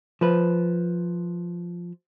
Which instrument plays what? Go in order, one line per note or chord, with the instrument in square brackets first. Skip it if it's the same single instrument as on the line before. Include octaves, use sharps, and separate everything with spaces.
[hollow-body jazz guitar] F3 B4